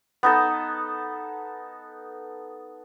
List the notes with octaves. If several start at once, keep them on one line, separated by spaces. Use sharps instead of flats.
B3 D#4 A4